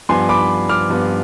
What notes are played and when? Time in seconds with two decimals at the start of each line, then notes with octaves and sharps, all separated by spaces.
0.09 G2 F3 B3 G#5 C6
0.29 B5 D6
0.69 D6 F6
0.90 G2 F3 B3